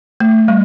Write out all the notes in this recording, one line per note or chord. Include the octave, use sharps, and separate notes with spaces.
A3
G3